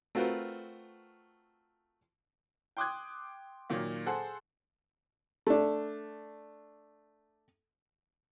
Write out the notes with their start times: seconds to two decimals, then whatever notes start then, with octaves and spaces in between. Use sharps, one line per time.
0.15 A3 C4 F4 F#4 A#4 B4
2.77 G5 C6 D6 D#6 F#6 G#6
3.70 A#2 D#3 F#3 A#3
4.06 G#4 A4 C5 F#5
5.47 A3 D4